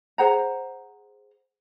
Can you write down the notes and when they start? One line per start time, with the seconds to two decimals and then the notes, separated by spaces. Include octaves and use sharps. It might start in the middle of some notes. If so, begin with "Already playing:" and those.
0.18 G#4 C5 F#5 A#5